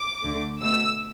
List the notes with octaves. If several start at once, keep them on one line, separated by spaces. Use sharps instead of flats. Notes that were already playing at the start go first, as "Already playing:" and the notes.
Already playing: D6
D2 D3 A3
B2 A3 E6